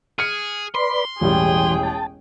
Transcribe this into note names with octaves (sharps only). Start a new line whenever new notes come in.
G#4 F6 C#7
B4 D5 B5 C6
E1 A1 E3 G3 G#4 G5
A5